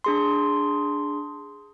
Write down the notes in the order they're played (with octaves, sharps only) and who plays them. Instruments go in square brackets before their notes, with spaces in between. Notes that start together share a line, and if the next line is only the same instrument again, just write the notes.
[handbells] D4 G#4 C6